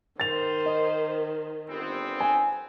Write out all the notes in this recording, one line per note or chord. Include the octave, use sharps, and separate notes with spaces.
D#3 C5 A6 F7
D#5
G1 B3 C4
G#5